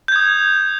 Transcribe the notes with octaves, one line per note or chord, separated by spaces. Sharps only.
D#6 G6 G#6